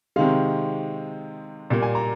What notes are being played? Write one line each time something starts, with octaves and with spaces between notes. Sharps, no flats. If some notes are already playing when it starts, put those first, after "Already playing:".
C3 D#3 G#3 F5
A#2 G3 A#3
G#5
A#5